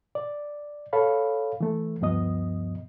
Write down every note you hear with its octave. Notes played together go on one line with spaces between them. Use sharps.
D5
A4 C#5 F5 B5
E3 A3
D2 G2 F3 B3 D#5 D#6